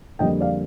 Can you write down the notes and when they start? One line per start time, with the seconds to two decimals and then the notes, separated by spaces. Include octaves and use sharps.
0.19 F2 D3 G3 A#3 D#5 G5
0.40 D5 F5